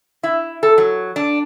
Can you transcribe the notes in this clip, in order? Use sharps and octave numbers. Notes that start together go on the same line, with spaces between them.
E4
A4
F#3
D4